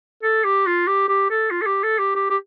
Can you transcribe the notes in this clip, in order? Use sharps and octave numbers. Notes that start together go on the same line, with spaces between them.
A4
G4
F4
G4
G4
A4
F4
A4
G4
A4
G4
G4
G4